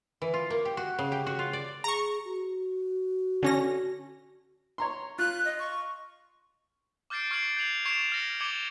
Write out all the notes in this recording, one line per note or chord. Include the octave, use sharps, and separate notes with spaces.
E3
F4
A#3
G4
F#4
C#3
G4
F#4
F4
D5
G#4 A#5 C#6
F#4
D3 C#4 A#6
C#5 A#5 C6
F4 F#6
D#5
C#6
D6 F6 G6 A6 C7 D7
C#6 F6 G#6 C7 D7 F#7
G6 G#6 C7 F7 F#7
C#6 G#6 C7 D7 E7 F7
F6 A#6 C#7
D6 G#6 C#7 F#7 G7